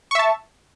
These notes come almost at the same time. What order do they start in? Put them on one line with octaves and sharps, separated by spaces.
C#6 E5 A5